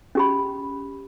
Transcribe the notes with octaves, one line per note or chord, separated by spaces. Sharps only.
C#4 G4 B5